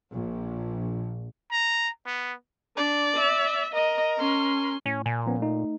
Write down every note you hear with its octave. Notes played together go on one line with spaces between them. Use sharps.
A#1
A#5
B3
D4 D5
E5
A#4 D#5
C#4 C6
A2 C#4
A#2 G#5
F3 B3 C#4
A3 D#4